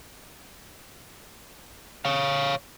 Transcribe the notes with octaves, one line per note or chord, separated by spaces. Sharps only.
C#5 F5